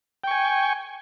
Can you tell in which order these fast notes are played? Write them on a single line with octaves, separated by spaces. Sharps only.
G5 C#6 G#5